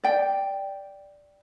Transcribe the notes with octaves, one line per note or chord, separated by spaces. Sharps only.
D5 G5